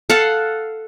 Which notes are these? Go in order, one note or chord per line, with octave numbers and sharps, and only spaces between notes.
A4 F5 F#5